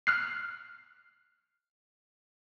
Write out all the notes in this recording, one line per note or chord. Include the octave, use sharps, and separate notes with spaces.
F6 F#6 C7